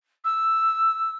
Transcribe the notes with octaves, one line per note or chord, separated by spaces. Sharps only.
E6